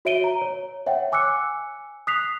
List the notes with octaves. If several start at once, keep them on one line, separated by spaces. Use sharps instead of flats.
F#4 C#5 E5 D7 D#7 G7
A#5
C#5
C#5 E5 F#5 G5
G#5 D6 E6 F#6 C#7
D#6 F#6 B6 C7 F7